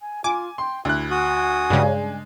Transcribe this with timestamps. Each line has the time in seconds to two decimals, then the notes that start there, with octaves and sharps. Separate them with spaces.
0.01 G#5
0.24 F4 G#5 D6
0.58 G5 C6
0.85 D2 E4 F#6
1.11 F#4 G#5 D#6
1.70 G2 C#3 G#3 D4